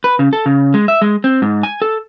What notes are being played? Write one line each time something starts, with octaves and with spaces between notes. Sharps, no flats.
B4
C#3
A4
C#3
G#3
E5
G#3
C4
G#2
G#5
A4